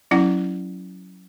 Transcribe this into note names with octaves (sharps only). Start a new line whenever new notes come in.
F#3 C#4 E4 F#5